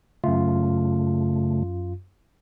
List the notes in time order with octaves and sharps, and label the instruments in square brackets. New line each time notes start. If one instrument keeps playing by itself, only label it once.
[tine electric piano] F#2 F4 [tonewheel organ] C#3 A3